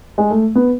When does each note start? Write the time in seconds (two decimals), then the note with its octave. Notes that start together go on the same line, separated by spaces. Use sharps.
0.18 G#3
0.31 A3
0.55 B3